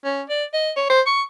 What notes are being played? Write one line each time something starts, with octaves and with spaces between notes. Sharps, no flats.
C#4
D5
D#5
C#5
C5
C#6